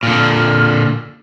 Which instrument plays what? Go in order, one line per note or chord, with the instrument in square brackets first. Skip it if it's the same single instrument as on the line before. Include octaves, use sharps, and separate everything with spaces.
[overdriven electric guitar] A#2 D3 [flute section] F6